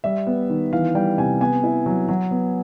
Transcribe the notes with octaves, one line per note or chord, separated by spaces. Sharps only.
G3 E5
B3
D#3
E3 F5
G3 G5
C3 G#5
B3 G#5
E4
F#3
F#3
B3